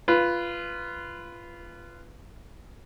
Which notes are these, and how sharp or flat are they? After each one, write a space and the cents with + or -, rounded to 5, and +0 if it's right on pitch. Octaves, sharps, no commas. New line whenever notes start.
F4 -15 B4 +0